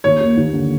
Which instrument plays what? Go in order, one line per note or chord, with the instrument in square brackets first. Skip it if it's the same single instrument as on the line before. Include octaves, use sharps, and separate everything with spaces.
[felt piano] D#2 [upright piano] C#5
[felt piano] A#3
D#2
D3